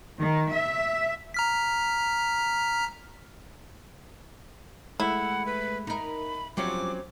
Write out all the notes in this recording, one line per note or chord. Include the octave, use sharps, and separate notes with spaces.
D#3
E5
A#5 F6 B6
G#3 A3 E4 F#5
B4
D#4 A#4 B5
G2 F3 F#3 C4 C#4 D6